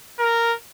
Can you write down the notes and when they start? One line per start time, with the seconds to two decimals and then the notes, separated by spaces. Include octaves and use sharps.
0.19 A#4